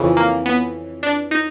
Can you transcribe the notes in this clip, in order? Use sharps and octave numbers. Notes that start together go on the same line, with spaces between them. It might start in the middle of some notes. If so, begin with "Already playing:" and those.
Already playing: F2 C#3 E3
A#3
B3
D4
D#4